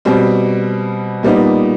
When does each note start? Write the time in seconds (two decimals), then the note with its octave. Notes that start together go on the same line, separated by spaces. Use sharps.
0.05 B2 G3 C4
1.23 A#2 G3 B3 D#4